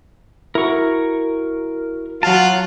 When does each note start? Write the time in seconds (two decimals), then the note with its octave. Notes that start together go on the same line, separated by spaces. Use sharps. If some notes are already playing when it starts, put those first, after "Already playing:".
0.55 E4 F#4 A#4 C#6
2.23 F#3 F4 F#5 A5